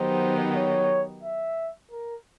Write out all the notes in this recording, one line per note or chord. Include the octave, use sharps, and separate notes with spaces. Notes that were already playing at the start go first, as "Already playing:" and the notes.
Already playing: D#3 F#3 B3 D#4 G4 C5
C#5
E5
A#4